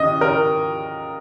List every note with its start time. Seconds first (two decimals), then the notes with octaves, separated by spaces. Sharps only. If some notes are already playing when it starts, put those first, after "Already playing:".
Already playing: D#2 C#3 D#5
0.21 A#4